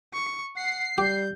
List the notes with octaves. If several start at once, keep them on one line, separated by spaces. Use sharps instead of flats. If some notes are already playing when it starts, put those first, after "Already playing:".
C#6
F#5 C7
G3 G4 G6